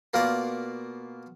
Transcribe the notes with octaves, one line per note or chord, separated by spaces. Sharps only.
B2 A#3 F4 A#4 D5